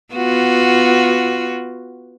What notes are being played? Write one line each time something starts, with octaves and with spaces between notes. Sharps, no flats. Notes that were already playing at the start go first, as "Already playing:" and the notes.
B3 F4 F#4